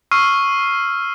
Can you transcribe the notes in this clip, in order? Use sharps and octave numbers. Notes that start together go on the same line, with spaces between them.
C#6 E6 F6 C7 D#7